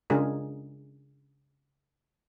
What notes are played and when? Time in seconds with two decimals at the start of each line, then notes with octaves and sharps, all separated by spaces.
0.10 C#3 G#3 D4 F4 G#4 A#4